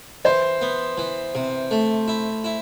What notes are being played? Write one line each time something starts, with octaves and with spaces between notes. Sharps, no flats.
E3 C5
B3
E3
C3
A3
E4
E4